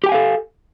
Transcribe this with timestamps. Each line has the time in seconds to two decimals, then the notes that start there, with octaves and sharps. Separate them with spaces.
0.04 G4
0.06 G5
0.09 G#5
0.12 F5
0.14 A4